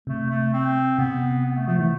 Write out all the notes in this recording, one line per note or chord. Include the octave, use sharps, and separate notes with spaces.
C3 A3
A3
C4
C3 B3
B3
A3
F3 A3
E3 A3